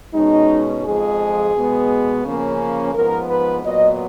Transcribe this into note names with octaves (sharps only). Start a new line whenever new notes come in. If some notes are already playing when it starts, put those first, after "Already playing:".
B2 G#3 C#4 D#4
F2 F3 G#3 G#4
B2 G#3 B3
C#3 F3 A#3 C#4
G#2 F3 B3 A#4
B4
A#2 F#3 B3 D#5